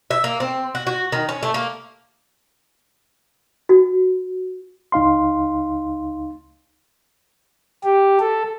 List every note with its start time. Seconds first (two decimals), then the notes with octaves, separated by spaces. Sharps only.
0.11 E5
0.24 A#3
0.40 C4
0.75 F#4
0.87 F#4
1.12 D#3
1.29 C#4
1.43 A3
1.54 A#3
3.69 F#4
4.92 C#2 D#4 F5 C6
7.84 G4
8.20 A4